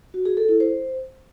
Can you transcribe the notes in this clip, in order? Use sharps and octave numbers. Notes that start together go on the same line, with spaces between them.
F#4
G#4
A4
E4
C5